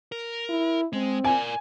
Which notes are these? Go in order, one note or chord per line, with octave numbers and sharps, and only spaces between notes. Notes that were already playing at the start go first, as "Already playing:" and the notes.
A#4
E4
G#3 C4
A#4 D5 G#5